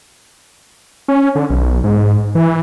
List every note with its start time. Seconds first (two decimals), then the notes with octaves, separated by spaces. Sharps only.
1.08 C#4
1.35 D3
1.50 B1
1.84 G#2
2.35 E3